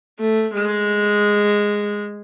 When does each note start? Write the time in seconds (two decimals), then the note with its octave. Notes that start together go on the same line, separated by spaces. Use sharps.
0.19 A3
0.53 G#3